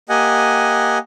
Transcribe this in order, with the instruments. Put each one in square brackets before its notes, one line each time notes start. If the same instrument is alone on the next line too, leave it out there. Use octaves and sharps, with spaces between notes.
[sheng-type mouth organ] A#3 G4 D#5 F#5 G#5